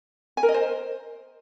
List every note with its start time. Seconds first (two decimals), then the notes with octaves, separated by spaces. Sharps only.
0.37 G#5
0.43 A#4
0.49 D#5
0.54 C5